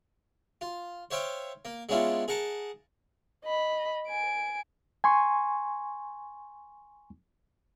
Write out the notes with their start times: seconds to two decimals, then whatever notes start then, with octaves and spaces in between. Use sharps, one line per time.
0.61 F4
1.11 C5 C#5 E5 F5 G5
1.65 A#3
1.89 G#3 B3 C#4 D4 E4 F4
2.28 G#4 A#4 F#5 A5
3.44 D#5 B5
4.08 G#5 D7
5.04 G#5 C6 C#6